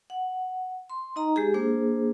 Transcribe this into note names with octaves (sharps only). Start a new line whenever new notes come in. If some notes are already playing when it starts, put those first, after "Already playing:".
F#5
C6
D#4 D#5 A#5
G#3 G4 G#4
A#3 D4 G#4 C5